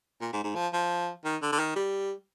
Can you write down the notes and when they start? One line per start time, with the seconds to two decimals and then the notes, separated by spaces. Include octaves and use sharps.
0.21 A#2
0.33 G#2
0.44 G#2
0.55 F3
0.73 F3
1.24 D#3
1.42 D3
1.52 D3
1.59 D#3
1.76 G3